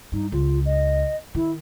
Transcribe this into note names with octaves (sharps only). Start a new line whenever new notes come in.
G2 D#4
C#2 F4
D#5
D#3 E4